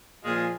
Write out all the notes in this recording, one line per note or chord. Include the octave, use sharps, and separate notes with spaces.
A#2 F3 G#3 F4 G#4